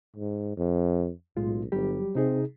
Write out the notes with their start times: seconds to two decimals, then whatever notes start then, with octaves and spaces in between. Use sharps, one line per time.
0.16 G#2
0.57 F2
1.37 B1 A2 G#3 F4
1.72 G1 F#3 G3 G4
2.15 C3 C4 D#4 G#4